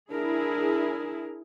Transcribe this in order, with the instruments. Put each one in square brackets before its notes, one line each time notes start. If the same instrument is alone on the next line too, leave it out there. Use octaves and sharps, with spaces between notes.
[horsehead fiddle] D4 A#4 [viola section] E4 G#4